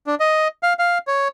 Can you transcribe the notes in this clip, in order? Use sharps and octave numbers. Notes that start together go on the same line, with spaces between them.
D4
D#5
F5
F5
C#5